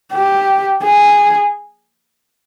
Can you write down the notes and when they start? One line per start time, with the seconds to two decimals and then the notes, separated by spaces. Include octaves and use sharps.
0.14 G4
0.84 G#4